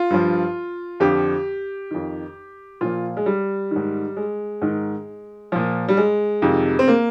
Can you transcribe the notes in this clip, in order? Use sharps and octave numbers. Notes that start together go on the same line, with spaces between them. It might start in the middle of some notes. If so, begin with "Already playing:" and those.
Already playing: F4
G2 F3
F2 D3 F3 G4
F2 D#3
A#2 F3 F4
G#3
G3
G#2 D#3
G#3
G#2 D#3
A#2 F3
G3
G#3
F2 C3 D#3
C4
A#3